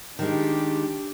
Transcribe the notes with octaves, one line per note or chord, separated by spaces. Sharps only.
D#3 G#3 D4 G4